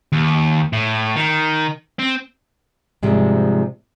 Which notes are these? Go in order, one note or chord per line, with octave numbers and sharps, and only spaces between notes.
D#2
A2
D#3
C4
G#2 C3 F3 G3 G#3